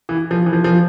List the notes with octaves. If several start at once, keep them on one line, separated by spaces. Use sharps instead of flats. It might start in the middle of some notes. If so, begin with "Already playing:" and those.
E3
F3
E3
F3
F3